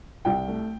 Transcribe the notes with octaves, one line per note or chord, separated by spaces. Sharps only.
C2 G5
A3